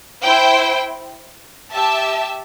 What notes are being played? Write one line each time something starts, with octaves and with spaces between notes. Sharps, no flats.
E4 C5 G5
G4 E5 A5